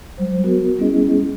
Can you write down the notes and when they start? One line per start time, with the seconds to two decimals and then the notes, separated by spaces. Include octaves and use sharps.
0.18 F#3 G3 C5
0.44 B3 F#4 A#4
0.78 G3 B3 C#4 E4 G#4 D#5